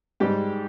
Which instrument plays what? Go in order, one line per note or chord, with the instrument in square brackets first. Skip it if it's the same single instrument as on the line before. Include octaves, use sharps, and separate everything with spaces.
[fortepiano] G#2 G3 G4